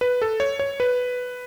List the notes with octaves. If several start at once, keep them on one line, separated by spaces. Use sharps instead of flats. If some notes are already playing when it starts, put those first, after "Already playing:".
B4
A4
C#5
C#5
B4